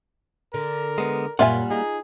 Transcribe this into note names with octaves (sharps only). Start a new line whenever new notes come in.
D3 A#4
G#3 B3
F#2 A#2 G3 A#3 F4 E5 F#5 G#5
D#4 G#4